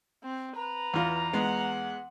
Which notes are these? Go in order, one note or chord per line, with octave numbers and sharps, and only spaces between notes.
C4
B4 A#5
E2 F4
G#3 B3 F#5